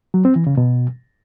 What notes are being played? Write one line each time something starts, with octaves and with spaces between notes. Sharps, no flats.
F#3
C4
E3
C#3
B2